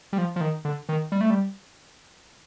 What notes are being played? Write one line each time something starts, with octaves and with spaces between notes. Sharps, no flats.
G3
F3
F3
D#3
D3
D#3
G3
A3
G3